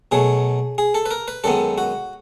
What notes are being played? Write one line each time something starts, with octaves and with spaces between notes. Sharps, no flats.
B2 F#3 A3 G#4
G#4
A4
B4
A#4
B4
F#2 D#3 G#3 B3 A4
F#4